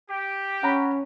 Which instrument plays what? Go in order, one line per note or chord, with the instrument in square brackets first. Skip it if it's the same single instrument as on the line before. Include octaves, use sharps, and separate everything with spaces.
[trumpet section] G4
[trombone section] C#4 [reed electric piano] F#5 A#5 B5